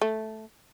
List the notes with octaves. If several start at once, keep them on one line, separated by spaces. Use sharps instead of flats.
A3